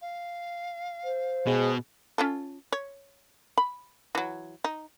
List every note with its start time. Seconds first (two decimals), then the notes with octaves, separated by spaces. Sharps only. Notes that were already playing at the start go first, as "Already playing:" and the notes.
0.01 F5
1.04 C5
1.47 B2 G#3
2.18 C#4 F4 A4
2.72 C#5
3.58 B5
4.15 E3 F#3
4.64 D#4